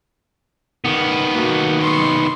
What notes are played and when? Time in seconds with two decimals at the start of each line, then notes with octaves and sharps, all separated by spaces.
0.85 D#3 B3
1.33 A#3 F#4
1.81 C6 C#6